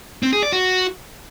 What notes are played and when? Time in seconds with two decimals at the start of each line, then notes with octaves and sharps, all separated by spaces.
0.23 C4
0.33 G#4
0.43 D5
0.52 F#4